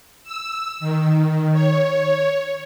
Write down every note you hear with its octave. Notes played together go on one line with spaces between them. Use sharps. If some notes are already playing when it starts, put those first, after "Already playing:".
E6
D#3
C#5